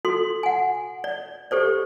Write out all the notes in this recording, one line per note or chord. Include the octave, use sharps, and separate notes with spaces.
F#4 A4 C6
F#5 G#5
D5
G4 A4 C5 D5